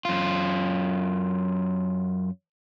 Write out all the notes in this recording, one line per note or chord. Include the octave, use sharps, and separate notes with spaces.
F#2 F4